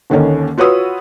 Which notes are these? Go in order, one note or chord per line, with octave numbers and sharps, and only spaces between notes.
D#2 D3 D#3 C#4 A#4
F4 F#4 B4 C#5 D#6 E6